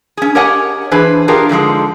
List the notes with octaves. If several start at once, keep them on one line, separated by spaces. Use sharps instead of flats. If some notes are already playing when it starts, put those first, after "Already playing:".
C#4 G#4
G4 A#4 C#5 D#5 F#5 G#5
E3 D4 G#4 B4 C5
D4 F4 G4 G#4 A#4
G#2 D3 F3 G#3